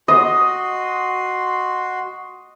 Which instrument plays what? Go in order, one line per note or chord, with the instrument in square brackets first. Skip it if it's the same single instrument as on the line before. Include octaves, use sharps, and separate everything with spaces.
[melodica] F#4 C6 [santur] D#5